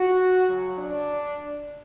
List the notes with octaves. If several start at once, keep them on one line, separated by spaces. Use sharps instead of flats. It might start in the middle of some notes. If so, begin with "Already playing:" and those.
Already playing: F#4
C#3 F#3
D4